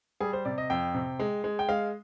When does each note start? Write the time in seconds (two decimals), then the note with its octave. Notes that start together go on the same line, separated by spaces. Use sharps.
0.20 G3 G#4
0.33 C5
0.45 C3 D5
0.58 D#5
0.70 F2 G5
0.94 C3
1.19 G#3
1.44 G#3
1.59 G5
1.68 G#3 F5